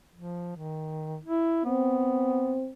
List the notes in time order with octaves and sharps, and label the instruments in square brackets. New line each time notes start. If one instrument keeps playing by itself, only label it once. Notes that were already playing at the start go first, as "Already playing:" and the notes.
[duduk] F3
D#3
E4
[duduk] B3 [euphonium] C4